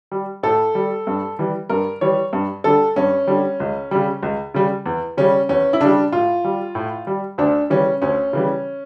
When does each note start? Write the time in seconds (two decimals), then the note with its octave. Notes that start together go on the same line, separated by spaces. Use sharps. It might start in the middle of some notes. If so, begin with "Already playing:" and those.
0.12 G3
0.43 A2 A4
0.75 G3
1.07 G2
1.39 E3 G3
1.70 G2 A#4
2.01 E3 G3 C#5
2.33 G2
2.64 D3 G3 A4
2.96 G2 C#4
3.27 D3 G3
3.60 C#2
3.91 C#3 G3
4.23 C#2
4.54 C#3 G3
4.86 E2
5.17 C#3 G3 C#4
5.49 E2 C#4
5.73 E4
5.81 C#3 G3 D4
6.12 A2 F4
6.44 G3
6.75 A2
7.07 G3
7.38 D2 D4
7.70 C#3 E3 G3 C#4
8.02 D2 C#4
8.33 C#3 E3 G3